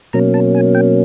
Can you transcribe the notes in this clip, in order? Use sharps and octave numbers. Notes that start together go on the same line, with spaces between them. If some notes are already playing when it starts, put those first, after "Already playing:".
B2 F#3 A#3 C#4 A#5
A5
G#5
G5